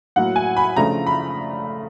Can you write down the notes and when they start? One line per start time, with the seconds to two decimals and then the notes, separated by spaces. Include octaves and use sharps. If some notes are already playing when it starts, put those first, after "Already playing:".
0.16 A2 F#3 A#3 F#5
0.36 G#5
0.57 B5
0.76 C#3 F3 A3 D4 F4 A#5
1.07 B5